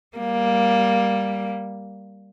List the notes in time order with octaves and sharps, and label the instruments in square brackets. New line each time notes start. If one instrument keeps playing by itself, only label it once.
[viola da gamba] G3 A#3